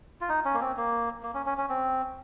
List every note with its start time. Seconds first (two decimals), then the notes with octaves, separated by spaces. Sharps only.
0.21 F4
0.29 D#4
0.45 C#4
0.54 A#3
0.61 C4
0.77 A#3
1.23 A#3
1.34 C#4
1.46 C#4
1.58 C#4
1.69 C4